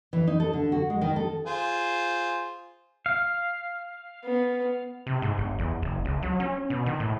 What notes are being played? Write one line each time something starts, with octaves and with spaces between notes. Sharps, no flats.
E3
D#4
A4
D3
F#4
G#3
D#3
A4
F4 G#4 C5
F5
B3
C3
G#2
G1
E2
F#1
C#2
F#3
C#4
B2
D#3
A2